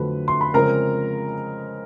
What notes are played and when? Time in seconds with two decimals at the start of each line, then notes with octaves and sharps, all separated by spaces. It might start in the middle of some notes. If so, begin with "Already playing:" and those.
Already playing: F2 D3 F#3 A3 C4 B4
0.28 C6
0.41 B5
0.54 C#3 F3 G#3 C4 A#4 A#5